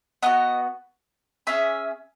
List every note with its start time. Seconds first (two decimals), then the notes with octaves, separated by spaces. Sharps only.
0.22 B3 D#4 F#4 D#5
1.47 C#4 G#4 E5